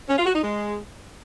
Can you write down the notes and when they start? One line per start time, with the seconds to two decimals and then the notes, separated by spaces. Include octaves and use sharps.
0.08 C#4
0.17 F4
0.25 F#4
0.34 D#4
0.42 G#3